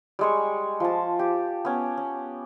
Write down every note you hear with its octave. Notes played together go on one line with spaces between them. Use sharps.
G3 G#3 C#6
F3 A5
G4
B3 C#4
C#4